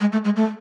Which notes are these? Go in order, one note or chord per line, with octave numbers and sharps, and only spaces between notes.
G#3
A3
G#3
A3